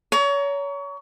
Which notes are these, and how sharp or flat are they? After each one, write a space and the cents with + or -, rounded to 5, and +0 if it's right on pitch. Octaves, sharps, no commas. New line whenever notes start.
C#5 +30 A#5 +0